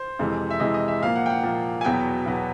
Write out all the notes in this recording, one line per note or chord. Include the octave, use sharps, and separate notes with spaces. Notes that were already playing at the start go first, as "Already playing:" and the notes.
Already playing: C5
F2 C3 E3 G#3
E5
F2 C3 E3 G#3 D#5
D#5
E5
A#2 F3 A#3 F5
F#5
G5
F#5
A#2 F3 A#3
G#5
E2 B2 F#3 B3 G5
E2 B2 F#3 B3